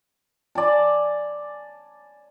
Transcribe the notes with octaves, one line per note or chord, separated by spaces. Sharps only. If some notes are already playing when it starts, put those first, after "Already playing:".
D5 G#5 A5